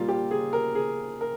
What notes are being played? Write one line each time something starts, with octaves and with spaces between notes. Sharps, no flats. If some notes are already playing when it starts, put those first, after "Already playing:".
Already playing: A#2 G3 A#3 F4
G4
G#4
A#4
G#4
A#4